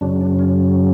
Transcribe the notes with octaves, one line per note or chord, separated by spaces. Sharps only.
F#2 C#3 F#3 D4
D4
C#4